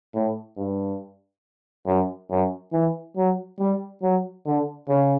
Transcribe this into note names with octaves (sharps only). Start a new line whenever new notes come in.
A2
G2
F#2
F#2
E3
F#3
G3
F#3
D3
C#3